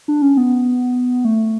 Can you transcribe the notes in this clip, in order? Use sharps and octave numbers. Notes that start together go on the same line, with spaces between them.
D4
C#4
B3
A3